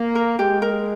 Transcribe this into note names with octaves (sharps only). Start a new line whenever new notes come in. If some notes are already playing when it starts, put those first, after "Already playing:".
Already playing: A#3
A#4
G#3 G4
A#4